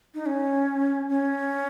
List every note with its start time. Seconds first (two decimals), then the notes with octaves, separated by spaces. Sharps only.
0.14 D#4
0.26 C#4
1.10 C#4